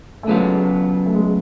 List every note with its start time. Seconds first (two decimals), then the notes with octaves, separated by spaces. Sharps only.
0.23 A3
0.27 C#3 F#3 G#3 B3 F4 A4
1.06 A3
1.14 G#3
1.24 A3